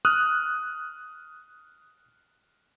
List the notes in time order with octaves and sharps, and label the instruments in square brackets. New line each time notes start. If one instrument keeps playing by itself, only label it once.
[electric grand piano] D#6 F6 F#6